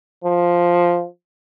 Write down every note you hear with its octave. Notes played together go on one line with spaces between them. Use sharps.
F3